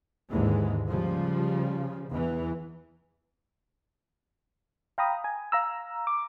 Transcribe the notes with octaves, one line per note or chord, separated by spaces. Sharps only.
D#2 G#2 D3 E3 G#3
C#3 F3 G3
E2 E3
F5 G5 A#5 B5 D#6
G#5
F5 A#5 E6
D6